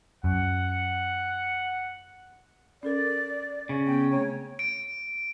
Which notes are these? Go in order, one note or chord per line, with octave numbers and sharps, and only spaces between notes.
F#2 F#5
C#4 A4 A#4 D5
C#3
B3 G5
A3 C4 C#5
D7